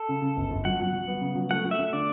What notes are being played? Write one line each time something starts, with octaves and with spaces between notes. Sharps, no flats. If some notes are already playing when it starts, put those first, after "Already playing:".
Already playing: A4
C#3
C#3
G1
G1
F#3 F#5
F#3
F#3
B3
C#3
F#3
A3 F#5
A3
E5
A3
D3 D5